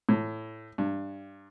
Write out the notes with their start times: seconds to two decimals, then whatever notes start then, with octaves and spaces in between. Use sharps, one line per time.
0.09 A2
0.78 G2